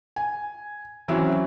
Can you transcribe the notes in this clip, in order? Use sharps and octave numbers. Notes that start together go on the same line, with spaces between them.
G#5
E3 F#3 C4 C#4 E4